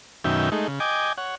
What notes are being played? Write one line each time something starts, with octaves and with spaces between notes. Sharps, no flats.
F#2 B2 D#3 C#4 E5 G5
G#3 A3 D#4
C#3
D#5 G5 G#5 D6
C#5 F#5